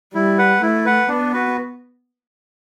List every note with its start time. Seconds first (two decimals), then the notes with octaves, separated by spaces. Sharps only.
0.14 G3 E4
0.38 B4 F#5
0.62 A3 E4
0.85 B4 F#5
1.08 B3 D4
1.33 F#4 B4